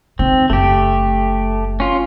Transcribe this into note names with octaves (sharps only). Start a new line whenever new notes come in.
D#3 C4
F#1 A3 G4
C#4 F4